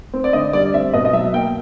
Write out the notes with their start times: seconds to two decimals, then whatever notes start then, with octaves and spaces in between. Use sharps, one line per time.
0.14 C4
0.24 D5
0.33 D3 D#5
0.53 G3 D5
0.74 C4 E5
0.94 B2 D#5
1.05 D#5
1.13 F#3 E5
1.34 A#3 G5